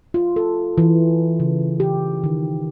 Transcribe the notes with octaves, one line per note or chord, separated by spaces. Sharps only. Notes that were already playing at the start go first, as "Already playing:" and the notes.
F4
A4
E3
C#3
G4
D#3